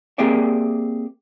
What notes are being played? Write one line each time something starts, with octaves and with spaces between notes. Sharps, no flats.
A#3 C4 G4 G#4 D5 E5